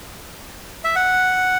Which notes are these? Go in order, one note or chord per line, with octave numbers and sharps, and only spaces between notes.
E5
F#5